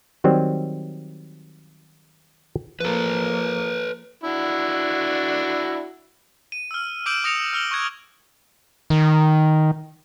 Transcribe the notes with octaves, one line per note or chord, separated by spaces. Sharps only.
D#3 F#3 G3 C4
F3 A#3 A4 B4
D4 E4 F#4
D#7
E6 F6
D6 E6 G6 D7 E7 F#7
D#6 A#6 C#7 F7
E6 F6 F#7 G7
C#6 F#6 G#6 D7
D#3